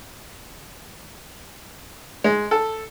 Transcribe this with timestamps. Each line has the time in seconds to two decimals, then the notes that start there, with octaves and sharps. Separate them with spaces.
2.24 G#3
2.51 A4